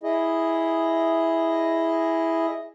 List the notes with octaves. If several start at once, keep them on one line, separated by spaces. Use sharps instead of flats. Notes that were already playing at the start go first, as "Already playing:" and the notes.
E4 G#4 D#5